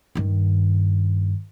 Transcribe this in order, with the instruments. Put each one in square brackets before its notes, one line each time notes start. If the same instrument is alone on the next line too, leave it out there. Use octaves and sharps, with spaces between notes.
[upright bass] G2 D#3